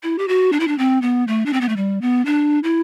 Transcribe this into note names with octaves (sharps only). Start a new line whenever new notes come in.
E4
G4
F#4
D4
E4
D4
C4
B3
A3
D4
C4
B3
A3
G3
B3
D4
E4